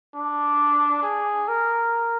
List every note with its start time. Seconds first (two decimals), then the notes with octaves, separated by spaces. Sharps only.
0.15 D4
1.03 G#4
1.48 A#4